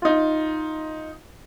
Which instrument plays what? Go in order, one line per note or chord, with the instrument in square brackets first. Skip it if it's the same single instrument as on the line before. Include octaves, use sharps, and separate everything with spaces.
[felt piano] D#4 F4